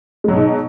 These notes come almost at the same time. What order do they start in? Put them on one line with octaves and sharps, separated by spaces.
G#3 F#3 B2 D#4